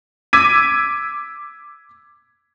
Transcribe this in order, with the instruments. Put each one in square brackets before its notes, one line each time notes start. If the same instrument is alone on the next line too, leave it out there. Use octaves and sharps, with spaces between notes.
[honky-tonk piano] D6 E6 G#6 B6 D#7